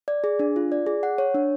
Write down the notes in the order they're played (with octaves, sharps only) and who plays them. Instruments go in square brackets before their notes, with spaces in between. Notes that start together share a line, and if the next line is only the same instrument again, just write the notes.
[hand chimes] D5
G#4
D4
F4
D5
G#4
F#5
C#5
D4